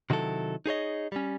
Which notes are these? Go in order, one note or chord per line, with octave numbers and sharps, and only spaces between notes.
C3 D#3 F#3 E4 A4
D#4 G#4 C#5 D#5
G3 C#4